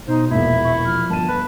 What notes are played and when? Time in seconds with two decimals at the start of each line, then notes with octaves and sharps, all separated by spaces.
0.08 B2 D#4 C5
0.30 E1 A#1 E2 A#3 E4 E5
0.65 C#6
0.86 F3 F6
1.10 G1 A5 D#7
1.29 B4 B5